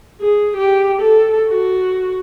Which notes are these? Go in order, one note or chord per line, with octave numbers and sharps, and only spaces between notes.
G#4
G4
A4
F#4